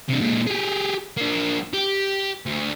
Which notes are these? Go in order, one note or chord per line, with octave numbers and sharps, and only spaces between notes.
C3 D4
A#2 G#3
G4 G#4
A#3 D4
G4
D2